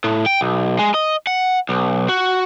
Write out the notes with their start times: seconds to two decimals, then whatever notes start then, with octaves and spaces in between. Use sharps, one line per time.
0.04 A2
0.26 G5
0.41 B1
0.79 G#3
0.94 D#5
1.27 F#5
1.69 B1
2.09 F#4